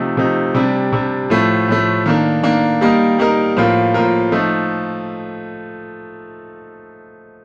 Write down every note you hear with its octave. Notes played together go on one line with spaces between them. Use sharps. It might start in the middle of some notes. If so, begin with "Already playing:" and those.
Already playing: C3 F3 A3 D#4
C3 F3 A3 D#4
C3 G3 D4
C3 G3 D4
A2 F3 A3
A2 F3 A3
D#3 A#3 D4
D#3 A#3 D4
G3 A#3 D#4 A#4
G3 A#3 D#4 A#4
A2 F3 A#3 F4 A#4
A2 F3 A#3 F4 A#4
F3 A3 D#4